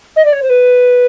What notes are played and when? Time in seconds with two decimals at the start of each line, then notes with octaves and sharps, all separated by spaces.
0.16 D#5
0.24 D5
0.32 C#5
0.42 C5
0.49 B4